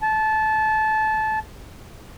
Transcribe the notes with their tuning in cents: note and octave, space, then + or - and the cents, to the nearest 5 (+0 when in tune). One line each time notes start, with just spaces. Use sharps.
A5 -20